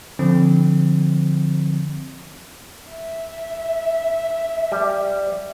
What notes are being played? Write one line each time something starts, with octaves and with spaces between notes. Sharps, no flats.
D3 F3 C4
E5
G3